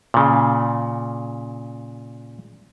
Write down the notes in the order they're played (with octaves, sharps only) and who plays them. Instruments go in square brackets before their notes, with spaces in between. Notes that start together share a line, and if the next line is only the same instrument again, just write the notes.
[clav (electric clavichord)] A#2 C#3